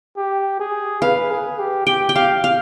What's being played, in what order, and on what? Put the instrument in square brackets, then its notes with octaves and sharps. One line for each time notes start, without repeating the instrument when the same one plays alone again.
[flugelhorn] G4
G#4
[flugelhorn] B4 [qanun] F5
[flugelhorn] G#4
G4
[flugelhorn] G4 [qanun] G5
[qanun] G5
[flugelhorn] G4 [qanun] F5
[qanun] F5